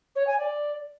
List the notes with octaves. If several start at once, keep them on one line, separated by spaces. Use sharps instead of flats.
C#5
G#5
D5